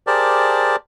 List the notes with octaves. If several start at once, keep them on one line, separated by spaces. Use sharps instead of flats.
G4 G#4 A#4 C5 D5 A5